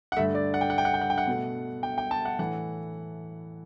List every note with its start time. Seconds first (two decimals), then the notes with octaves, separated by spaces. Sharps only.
0.12 F#5
0.16 G2 D3 A3 E5
0.35 D5
0.54 F#5
0.61 G5
0.70 F#5
0.78 G5
0.85 F#5
0.94 G5
1.01 F#5
1.10 G5
1.18 F#5
1.27 B2 A3
1.83 G5
1.98 G5
2.11 A5
2.25 F#5
2.39 A2 E3 A3 F#5